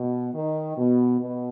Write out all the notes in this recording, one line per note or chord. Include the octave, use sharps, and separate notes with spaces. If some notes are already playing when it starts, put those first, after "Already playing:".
Already playing: B2
D#3
B2
B2